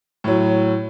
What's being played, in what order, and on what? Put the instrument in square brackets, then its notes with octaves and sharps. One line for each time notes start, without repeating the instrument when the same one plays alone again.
[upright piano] A2 F#3